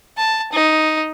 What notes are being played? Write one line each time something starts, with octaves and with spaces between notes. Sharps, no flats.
A5
D#4